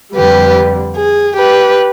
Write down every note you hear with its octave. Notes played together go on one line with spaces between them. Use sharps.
F2 D3 G3 G4 B4
G#4
G4 B4